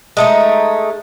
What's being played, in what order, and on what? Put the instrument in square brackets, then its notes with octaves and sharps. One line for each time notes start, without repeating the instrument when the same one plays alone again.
[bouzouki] G#3 A3 D#4